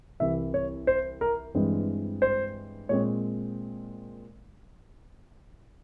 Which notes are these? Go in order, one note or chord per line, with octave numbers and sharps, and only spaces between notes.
C2 C3 E3 E5
C#5
C5
A#4
G2 E3 G#3 C4
C5
A#2 G#3 C4 C#5